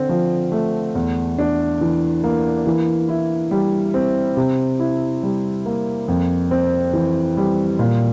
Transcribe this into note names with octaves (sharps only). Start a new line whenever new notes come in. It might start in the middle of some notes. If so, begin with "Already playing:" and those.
Already playing: D3 C4
F3
A3
E2
D4
E3
A#3
E3
E4
G3
C4
C3
E4
G3
A#3
F2
C4
E3
G3
A#2